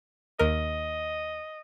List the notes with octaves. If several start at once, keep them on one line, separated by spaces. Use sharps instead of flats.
D#2 A#4 D#5